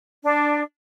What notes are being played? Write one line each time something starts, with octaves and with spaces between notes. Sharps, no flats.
D4